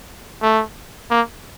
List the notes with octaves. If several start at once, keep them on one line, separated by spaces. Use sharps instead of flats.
A3
A#3